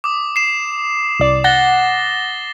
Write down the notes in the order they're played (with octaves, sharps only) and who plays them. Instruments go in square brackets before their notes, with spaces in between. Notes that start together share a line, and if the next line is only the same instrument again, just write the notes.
[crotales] D6 D#6
C7 E7
[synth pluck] C2 D5
[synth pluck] F#5 [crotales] A6 A#6 G7